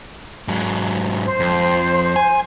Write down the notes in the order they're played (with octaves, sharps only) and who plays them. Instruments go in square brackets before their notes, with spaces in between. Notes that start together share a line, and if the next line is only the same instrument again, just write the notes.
[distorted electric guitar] G#2 F#3
[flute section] C5
[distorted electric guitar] F2
G#5